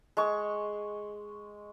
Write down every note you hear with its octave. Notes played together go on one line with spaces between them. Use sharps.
G#3 C#6